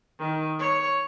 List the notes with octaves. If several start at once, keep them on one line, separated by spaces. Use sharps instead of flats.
D#3
C#5